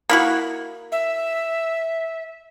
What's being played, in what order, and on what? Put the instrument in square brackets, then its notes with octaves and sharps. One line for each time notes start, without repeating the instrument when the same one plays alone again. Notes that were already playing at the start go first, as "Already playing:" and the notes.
[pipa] A#3 E4 F#4
[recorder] E5